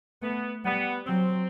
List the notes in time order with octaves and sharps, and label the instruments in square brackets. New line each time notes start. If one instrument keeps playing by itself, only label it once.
[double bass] A3 [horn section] B3
[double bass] G3 [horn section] B3
[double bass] F#3 [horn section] C4